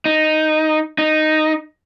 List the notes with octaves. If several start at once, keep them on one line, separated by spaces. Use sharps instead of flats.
D#4
D#4